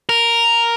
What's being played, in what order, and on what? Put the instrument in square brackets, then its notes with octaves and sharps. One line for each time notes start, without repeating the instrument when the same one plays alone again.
[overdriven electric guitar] A#4